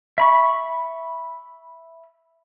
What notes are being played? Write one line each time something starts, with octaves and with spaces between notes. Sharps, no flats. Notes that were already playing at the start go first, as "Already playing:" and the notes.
E5 B5 C#6